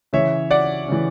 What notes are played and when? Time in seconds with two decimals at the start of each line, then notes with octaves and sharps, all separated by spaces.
0.13 C#3 E3 C#5 E5
0.51 D5 F#5
0.88 C#3 E3